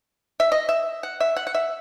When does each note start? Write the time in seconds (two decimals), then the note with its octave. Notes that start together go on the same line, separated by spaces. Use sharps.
0.40 E5
0.52 D#5
0.69 E5
1.03 F#5
1.20 E5
1.36 F#5
1.47 F#5
1.55 E5